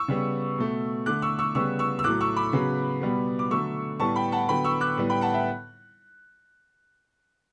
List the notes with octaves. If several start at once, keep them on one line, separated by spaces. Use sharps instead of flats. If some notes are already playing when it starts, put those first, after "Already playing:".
Already playing: C#6 E6
C#3 G3 B3
B2 A3
D3 A3 D6 F#6
C#6 E6
C#6 E6
C#3 G3 B3 C#6 E6
C#6 E6
E6
A2 F#3 A3 D6 F#6
C#6 E6
B5 D6
C#3 F#3 B3
B2 G3 B3
D6
D3 F#3 A3 C#6 E6
A2 G3 B3 A5 C#6
G5 B5
F#5 A5
D3 F#3 B3 G5 B5
C#6 E6
D6 F#6
A2 G3 B3
G5 B5
F#5 A5
E5 G5